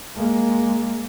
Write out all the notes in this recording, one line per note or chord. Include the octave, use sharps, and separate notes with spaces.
G#3 A#3